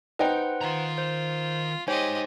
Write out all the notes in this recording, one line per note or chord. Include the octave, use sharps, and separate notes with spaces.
D#4 B4 C5 F#5 G5
D#3 F4 A#5
C5
D#4 G4 G#4 C5 C#5 D#5 G#5